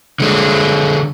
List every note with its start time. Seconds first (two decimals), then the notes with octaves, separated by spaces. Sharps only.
0.20 D3 G#3